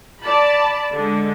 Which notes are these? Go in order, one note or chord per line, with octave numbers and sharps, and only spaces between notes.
D5 A5 B5
D3 G#3